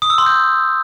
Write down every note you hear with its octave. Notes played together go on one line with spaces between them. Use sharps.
D#6
E6
C6
G6